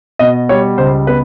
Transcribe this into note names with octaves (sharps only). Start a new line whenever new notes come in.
B2 D#5
G3 C#5
C#2 C5
B3 B4